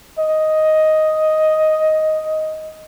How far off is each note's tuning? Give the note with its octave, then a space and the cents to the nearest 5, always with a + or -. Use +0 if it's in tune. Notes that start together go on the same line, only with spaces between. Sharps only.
D#5 +5